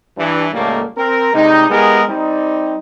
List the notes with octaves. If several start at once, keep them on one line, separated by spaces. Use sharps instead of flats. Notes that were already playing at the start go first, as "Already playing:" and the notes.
G2 E3
C#2 A2 G3 A3 A#3
C4 A#4
C3 G3 G#3 D#4
G#3 B3 E4 G4 G#4 A#4
G3 C4 D#4